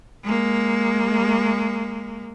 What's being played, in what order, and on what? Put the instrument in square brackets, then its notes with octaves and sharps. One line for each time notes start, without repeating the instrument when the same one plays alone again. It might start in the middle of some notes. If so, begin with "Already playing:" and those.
[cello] G#3 A#3